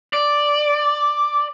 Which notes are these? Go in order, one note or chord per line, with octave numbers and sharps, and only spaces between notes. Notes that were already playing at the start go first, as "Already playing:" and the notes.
D5